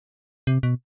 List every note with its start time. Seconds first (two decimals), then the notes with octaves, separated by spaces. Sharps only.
0.47 C3
0.63 B2